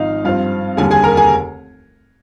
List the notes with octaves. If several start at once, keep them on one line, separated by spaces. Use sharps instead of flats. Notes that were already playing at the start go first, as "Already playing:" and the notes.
Already playing: G#1 G#2 F3 D#4 D#5 F5
G2 F3 C4 F4 F5
F1 D#2 D3 G3 G#4 G#5
G#4 G#5
A#4 A#5
G#4 G#5